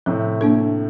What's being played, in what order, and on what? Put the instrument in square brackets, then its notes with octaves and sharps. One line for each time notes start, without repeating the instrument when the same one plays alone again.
[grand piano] A2 C3 [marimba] F3
[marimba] A#3 D4 A4